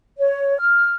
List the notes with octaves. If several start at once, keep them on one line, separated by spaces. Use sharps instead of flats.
C#5
F6